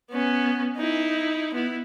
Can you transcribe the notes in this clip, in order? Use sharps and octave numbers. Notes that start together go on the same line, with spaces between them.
B3 C#4
D#4 E4
B3 E4